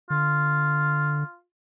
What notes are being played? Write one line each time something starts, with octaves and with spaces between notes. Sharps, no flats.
D3 F4